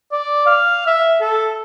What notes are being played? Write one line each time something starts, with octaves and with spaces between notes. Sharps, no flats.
D5
F5
E5
A4